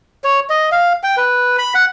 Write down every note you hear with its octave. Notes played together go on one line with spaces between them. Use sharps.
C#5
D#5
F5
G5
B4
B5
F#5